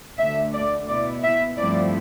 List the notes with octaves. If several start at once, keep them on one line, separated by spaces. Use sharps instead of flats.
D2 D3 A3 E5
D5
B2 B3 E4 D5
E5
G2 F3 A3 C4 E4 D5